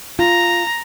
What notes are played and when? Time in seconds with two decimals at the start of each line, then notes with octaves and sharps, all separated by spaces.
0.19 F4 A#5